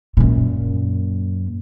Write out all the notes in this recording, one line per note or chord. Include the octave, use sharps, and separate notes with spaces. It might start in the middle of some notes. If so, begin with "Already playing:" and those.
F#2 A#2